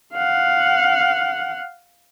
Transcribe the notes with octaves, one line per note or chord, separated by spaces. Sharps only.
F5 F#5